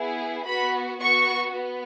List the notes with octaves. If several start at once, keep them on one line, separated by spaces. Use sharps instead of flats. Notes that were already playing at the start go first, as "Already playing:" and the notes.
Already playing: B3 E4 G#4
B3 F#4 B5
B3 F#4 C#6
B3